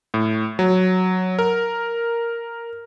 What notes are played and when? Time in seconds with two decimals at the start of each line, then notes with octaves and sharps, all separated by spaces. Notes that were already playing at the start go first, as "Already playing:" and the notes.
0.14 A2
0.59 F#3
1.39 A#4